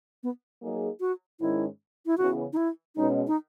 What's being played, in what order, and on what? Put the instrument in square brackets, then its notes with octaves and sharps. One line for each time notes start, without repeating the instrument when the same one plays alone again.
[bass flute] B3
[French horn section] F#3 A#3 D#4 G#4
[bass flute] F#4
[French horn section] G#2 D#3 G#3 C#4 [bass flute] E4
[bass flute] E4
[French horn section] C#3 E3 B3 [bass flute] F#4
[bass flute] D#4
E4
[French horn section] B2 G#3 C#4 [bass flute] D#4
[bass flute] D#4